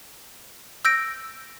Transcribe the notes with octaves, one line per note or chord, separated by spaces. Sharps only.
E6 G6 A#6 D7